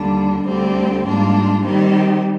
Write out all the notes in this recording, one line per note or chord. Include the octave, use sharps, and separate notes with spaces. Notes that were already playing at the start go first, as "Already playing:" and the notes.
Already playing: D#2 D3 G3 D4
D2 D3 G3 C4 G4
G#2 G3 A#3 D4 F4
D#3 G3 C4 G4